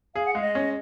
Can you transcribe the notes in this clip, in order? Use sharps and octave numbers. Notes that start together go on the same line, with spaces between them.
G#4 F5
F#5
G#3 F5
D#5
C#4